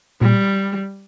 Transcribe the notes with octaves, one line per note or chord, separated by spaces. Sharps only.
A#2 G3